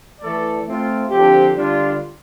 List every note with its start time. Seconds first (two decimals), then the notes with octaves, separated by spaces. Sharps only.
0.21 E3 A3 E4 A4 D5
0.66 A3 C4 F4
1.11 D3 F3 C4 G4
1.55 D3 G3 D4 F4